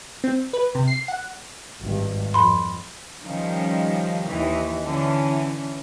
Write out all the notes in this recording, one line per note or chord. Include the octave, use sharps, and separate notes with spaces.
C4
B4
C3
C7
F#5
G#1 G2
F2 B5 C6
D#3 F3 G3 C#4
D#2 D#3 E3
D3 E3 C#4